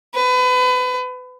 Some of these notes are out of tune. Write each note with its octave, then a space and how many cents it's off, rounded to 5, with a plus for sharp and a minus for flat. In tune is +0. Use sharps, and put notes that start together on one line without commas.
B4 +30